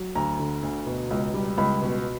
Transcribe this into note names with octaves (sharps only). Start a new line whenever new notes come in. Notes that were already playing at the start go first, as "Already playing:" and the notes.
Already playing: F#3
D2 A#5
D3
D2
B2
C#2
G3
C#2 B5
B2